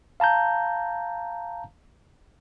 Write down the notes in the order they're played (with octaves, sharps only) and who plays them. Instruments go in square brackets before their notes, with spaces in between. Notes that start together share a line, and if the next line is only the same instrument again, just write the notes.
[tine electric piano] F5 A5 A#5 G6